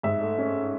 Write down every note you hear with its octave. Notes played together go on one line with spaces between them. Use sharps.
G#2 E5
A3
C#4